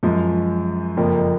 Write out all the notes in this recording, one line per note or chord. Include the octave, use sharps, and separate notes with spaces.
F#2 F3 G#3
F#1 F2 F3 A#3